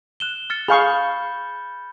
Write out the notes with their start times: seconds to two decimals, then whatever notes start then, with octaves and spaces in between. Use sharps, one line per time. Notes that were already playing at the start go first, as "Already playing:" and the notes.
0.20 F#6 E7 G7
0.50 F6 A6 C#7
0.68 G#4 F5 B5 C#6 G6 C#7